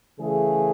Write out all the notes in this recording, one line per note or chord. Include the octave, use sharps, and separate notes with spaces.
C#3 E3 A3 G#4